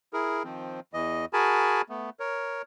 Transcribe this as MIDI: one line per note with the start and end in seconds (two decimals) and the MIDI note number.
0.13 0.43 64
0.13 0.43 68
0.13 0.43 70
0.44 0.80 51
0.44 0.80 53
0.44 0.80 60
0.93 1.25 40
0.93 1.25 52
0.93 1.25 75
1.33 1.82 66
1.33 1.82 68
1.33 1.82 70
1.33 1.82 80
1.33 1.82 81
1.33 1.82 83
1.89 2.10 57
1.89 2.10 59
2.20 2.62 70
2.20 2.62 73